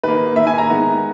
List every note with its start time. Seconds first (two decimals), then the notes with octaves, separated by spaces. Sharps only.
0.03 D#3 A#3 B4
0.36 D#3 A#3 E5
0.47 G#5
0.58 A#5
0.69 D#3 G#3 B3